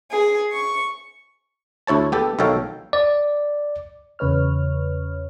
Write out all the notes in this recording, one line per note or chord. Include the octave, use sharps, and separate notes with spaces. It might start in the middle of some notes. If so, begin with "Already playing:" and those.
G#4
C#6
D2 E4 C#5 A5
B3 G4 A4
B1 D#3 A4 C#5 F5 G5
D5
E2 C#3 B4 C#5 F6